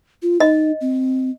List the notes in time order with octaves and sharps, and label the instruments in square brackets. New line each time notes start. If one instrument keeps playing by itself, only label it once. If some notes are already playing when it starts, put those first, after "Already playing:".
[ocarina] F4
[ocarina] D#4 [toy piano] D#5
[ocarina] C4